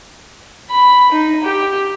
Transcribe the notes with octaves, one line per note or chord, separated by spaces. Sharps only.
B5
D#4
G4